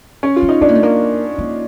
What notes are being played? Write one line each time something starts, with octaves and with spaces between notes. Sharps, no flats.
C#4
F4
B3
D#4
B3 D4
A#3
A3
A#3
A#3